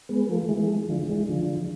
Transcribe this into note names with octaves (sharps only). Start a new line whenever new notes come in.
G#3 B3
F3 A3
E3 G#3
D3 F3
E3 G#3
D3 F3